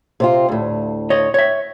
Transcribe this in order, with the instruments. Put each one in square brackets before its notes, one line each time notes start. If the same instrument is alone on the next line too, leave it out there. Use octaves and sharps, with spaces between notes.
[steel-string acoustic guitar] C3 C4 F4
D2 A2
[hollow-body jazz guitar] C#5 D#5
C#5 E5